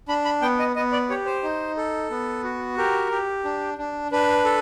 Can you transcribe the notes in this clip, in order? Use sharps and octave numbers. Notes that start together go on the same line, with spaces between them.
D4 B5
B5
B3 G5
D#5
B3 D#5
D5
G4 C#5
C5
D#4
A4
B3
F#4
G4 A#4
G4
D4
D4
D4 B4
A4